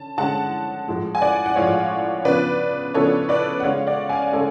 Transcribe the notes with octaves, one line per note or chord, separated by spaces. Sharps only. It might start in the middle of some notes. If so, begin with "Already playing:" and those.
Already playing: D3 C#4 A5
D3 G#3 C#4 F#5 A5
A2 F3 G#3
G#5
D5 F#5
F#5
A2 F3 G#3 C#5 F5
C#3 F3 B3 D4 B4 D5
C#3 F3 B3 D4 A4 C#5
B4 D5
F#5
C#3 G#3 C#4 C#5 F5
D5 F#5
F5 G#5
C#3 G#3 C#4 A4 C#5